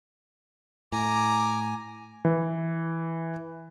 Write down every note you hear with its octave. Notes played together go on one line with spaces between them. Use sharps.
A2 G#5 A#5 D6
E3